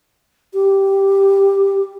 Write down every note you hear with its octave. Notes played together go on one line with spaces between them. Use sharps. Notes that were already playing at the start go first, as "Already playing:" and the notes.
G4